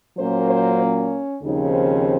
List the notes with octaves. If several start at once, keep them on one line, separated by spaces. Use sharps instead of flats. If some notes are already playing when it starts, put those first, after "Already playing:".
A#2 F#3 A#3 C#4 C5
C5
C#4
D#2 C#3 F3 C4 D#4